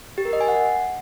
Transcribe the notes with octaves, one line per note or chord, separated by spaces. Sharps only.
G4
A#4
D#5
G#5
F#5